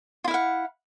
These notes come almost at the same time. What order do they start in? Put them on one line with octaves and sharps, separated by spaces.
F4 E4 F5 F#5